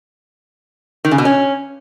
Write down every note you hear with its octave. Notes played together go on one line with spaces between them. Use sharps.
D#3
C#3
B2
C#4